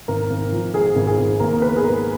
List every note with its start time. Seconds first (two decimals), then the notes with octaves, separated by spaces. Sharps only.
0.08 G#1 A#4
0.30 G#1
0.52 F3
0.74 G#2 G#4
0.96 G#1
1.07 G#4
1.18 G#1
1.40 D#2 A#4
1.62 B3 B4
1.77 G#4
1.84 G#3 A#4